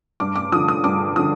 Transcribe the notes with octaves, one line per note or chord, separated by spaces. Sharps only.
G2 D6
D6
D3 F3 D#6
D#6
G2 D6
D3 F3 D#6